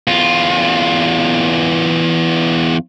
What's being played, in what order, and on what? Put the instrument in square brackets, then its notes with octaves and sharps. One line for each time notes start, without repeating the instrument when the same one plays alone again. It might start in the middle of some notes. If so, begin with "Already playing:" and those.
[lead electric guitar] E2 F4